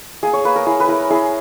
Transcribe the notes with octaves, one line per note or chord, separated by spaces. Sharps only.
A#3 G#4
C#5
A#3 B4
A#4
E4 G#4
B4
E4 A#4
E4 G#4